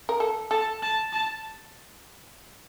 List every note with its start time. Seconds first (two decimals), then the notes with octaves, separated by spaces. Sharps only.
0.09 A#4
0.20 A4
0.51 A4 A5
0.82 A5
1.13 A5